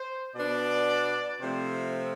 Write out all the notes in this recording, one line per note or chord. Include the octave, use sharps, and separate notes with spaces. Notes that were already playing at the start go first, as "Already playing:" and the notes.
Already playing: C5
B2 B3 D4 D5
C3 F3 A3 C4 C5